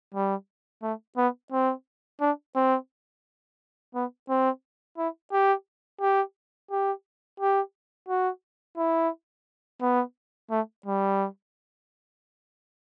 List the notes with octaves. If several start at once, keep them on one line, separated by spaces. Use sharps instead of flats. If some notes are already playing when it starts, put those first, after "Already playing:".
G3
A3
B3
C4
D4
C4
B3
C4
E4
G4
G4
G4
G4
F#4
E4
B3
A3
G3